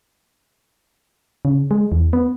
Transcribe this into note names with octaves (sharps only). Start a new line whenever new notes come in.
C#3
G#3
E2
B3